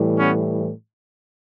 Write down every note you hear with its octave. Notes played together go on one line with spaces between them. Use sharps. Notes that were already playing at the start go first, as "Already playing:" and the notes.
Already playing: A2 E3 G3
B3 C#4